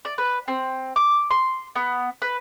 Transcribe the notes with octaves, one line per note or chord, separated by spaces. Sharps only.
D5
B4
C4
D6
C6
B3
B4